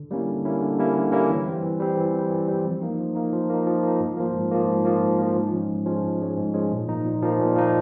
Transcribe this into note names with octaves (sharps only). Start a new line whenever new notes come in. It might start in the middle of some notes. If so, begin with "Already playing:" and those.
Already playing: D3
G3 A#3 C#4 E4
D3
G3 A#3 C#4 E4
D3
G3 A#3 C#4 E4
D3
G3 A#3 C#4 E4
E3
G3 C4
E3
G3 C4
E3
G3 C4
E3
G3 C4
F3
A#3 D#4
F3
A#3 D#4
F3
A#3 D#4
F3
A#3 D#4
G#2
F3 A#3
G#2
F3 A#3
G#2
F3 A#3
G#2
F3 A#3
G#2
F3 G#3 C#4
G#2
F3 G#3 C#4
G#2
F3 G#3 C#4
G#2
F3 G#3 C#4
A#2
F3 A#3 D#4
A#2
F3 A#3 D#4
A#2
F3 A#3 D#4